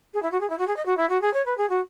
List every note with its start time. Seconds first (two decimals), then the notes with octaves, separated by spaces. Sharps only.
0.13 G#4
0.22 E4
0.31 F#4
0.40 G#4
0.49 E4
0.58 F#4
0.67 G#4
0.76 D#5
0.85 F#4
0.97 E4
1.09 F#4
1.21 G#4
1.33 C#5
1.45 B4
1.57 G#4
1.69 F#4